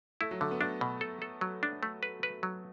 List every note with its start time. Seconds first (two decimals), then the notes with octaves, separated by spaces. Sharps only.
0.21 A3 E4
0.31 F#3
0.41 D3 A3
0.51 B3
0.61 A3 D4
0.81 B2
1.01 A4
1.22 A4
1.41 F#3
1.63 D4
1.83 A3
2.03 B4
2.23 B4
2.43 F#3